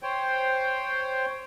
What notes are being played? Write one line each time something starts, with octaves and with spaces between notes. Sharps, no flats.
C5 C#5 G5